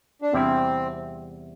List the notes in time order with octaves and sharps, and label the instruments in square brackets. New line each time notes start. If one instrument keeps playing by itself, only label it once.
[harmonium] D4
[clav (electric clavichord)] E2 C3 G3 E4 [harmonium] C4